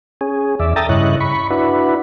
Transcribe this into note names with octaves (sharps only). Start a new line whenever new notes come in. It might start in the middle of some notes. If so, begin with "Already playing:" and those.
C#4 G#4
E2 D5 E5
A4 E5 G5 A#5 D#6 A6
G2 C#3 E4 C#5 D#5 F#6
B5 C#6
D4 E4 F#4 B4